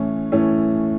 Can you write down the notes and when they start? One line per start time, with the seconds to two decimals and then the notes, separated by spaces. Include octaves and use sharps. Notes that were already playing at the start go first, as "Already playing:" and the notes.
Already playing: A2 E3 A3 C#4
0.32 A2 E3 A3 C#4